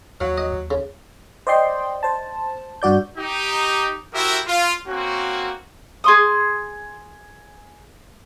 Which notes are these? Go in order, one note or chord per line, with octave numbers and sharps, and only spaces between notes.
D#2 F#3 F5
D#5
D#2
C#3
C5 D5 D#5 G5 C6
C5 A5
G2 F#4 D5 G6
D#4 G4
E4 F#4 G4 A#4 C5 E5
F4
A#3 C4 C#4 F#4
G#4 C6 D#6